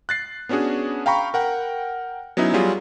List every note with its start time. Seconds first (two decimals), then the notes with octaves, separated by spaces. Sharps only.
0.09 F#6 A6 C7
0.49 B3 C#4 D4 F#4 G#4
1.06 F5 G5 A#5 B5 C#6
1.34 A#4 F#5 G5
2.37 F#3 B3 C#4 D#4 E4
2.53 F#3 G3 F4 G#4